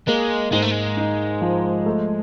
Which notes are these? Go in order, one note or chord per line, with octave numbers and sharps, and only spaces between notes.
G#3 A#3
G#2 G#3
A3
G#3
D#4
F3
A3